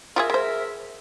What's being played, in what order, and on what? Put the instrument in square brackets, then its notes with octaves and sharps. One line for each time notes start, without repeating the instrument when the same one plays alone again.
[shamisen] F4 G4 G#4 [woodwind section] A#4 E5
[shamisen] G#3 C5